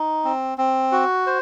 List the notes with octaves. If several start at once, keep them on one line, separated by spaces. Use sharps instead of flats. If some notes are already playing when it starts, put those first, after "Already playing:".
Already playing: D#4
C4
C4
F#4
C5